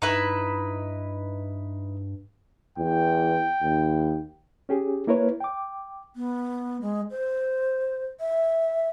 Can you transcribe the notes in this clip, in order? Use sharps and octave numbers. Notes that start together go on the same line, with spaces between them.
G2 D#4 E4 B4
E2 G5
D#2
C#4 G4 G#4
A#3 E4 A#4 B4 C#5
G5 D6
B3
G#3
C5
E5